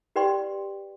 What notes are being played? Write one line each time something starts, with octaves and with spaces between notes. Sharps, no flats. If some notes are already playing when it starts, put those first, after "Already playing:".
G4 B4 D5 G5 C6